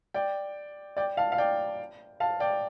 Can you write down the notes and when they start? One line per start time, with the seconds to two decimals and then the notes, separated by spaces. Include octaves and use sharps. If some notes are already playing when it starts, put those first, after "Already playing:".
0.14 D5 G5
0.97 D5 G5
1.17 F5 A5
1.32 F5
1.38 D5 G5
2.20 F5 A5
2.40 D5 G5